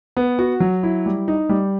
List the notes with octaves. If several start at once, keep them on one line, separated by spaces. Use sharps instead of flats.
B3
F#4
F#3
E4
G3
D#4
G3